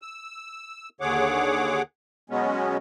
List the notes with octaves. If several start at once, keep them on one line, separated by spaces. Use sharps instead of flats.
E6
D#2 D3 G#4 C#5 F#5 D6
B2 F#3 G#3 B3 C#4